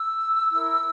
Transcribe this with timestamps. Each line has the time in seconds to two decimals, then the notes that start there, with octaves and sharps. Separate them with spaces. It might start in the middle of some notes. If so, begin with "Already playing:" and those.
Already playing: E6
0.51 E4 A#4